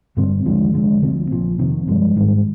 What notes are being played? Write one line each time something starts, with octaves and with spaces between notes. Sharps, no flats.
G2 D3 G3 C4
D#2 D3 F3 G#3
F1 F2 D3 G#3
D2 D3 F3 C4
A#1 A#2 F3
F1 F2 C3 D#3
G2 F3 G#3
G#1 G#2 D#3 G3